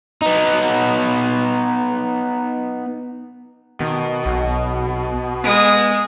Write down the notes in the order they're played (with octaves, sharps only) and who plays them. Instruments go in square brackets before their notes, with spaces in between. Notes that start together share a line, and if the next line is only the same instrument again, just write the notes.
[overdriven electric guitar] B3 D#4
[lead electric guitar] B2 [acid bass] D#3
[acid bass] B1
[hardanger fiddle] G#3 D#6 [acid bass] B3